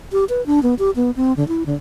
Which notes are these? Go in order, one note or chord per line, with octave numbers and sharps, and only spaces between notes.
G4
B4
D4
B3
G4
B3
C4
D3
E4
D3